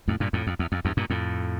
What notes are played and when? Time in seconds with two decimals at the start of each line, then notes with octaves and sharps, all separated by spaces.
0.08 F2 A2
0.20 G2 A#2
0.33 F2 A2
0.47 F2
0.59 E2
0.72 F2
0.85 E2 G2
0.97 G2 A#2
1.10 F2 A2